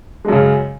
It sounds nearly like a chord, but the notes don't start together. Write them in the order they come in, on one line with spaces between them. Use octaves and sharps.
G#3 F#2 C#3